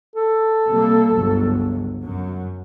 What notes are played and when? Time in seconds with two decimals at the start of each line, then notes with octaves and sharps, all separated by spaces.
0.16 A4
0.69 C3 G3 A#3
1.14 G1 C#2 F#3
2.02 F#2 F#3